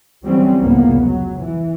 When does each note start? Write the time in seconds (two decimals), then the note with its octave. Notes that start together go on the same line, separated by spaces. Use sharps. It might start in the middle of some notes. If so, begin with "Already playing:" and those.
0.23 D3 E3 F#3 G3 C4 C#4
0.59 F1 C#2 A2 A#3 B3
1.00 F#3
1.41 E3